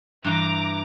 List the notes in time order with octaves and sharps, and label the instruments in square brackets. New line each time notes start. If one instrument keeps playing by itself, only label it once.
[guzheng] G2 E3 [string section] A#5 D6